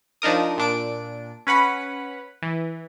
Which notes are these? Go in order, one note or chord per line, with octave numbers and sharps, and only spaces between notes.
F3 D4 D#4 A#4 D#6
A#2 D4 D7
C#4 B4 F#5 B5
E3